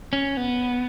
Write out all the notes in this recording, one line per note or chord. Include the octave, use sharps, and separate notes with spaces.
C#4
B3